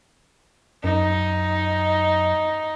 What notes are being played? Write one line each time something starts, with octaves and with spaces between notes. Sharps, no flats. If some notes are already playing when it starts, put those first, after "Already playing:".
F#2 D#4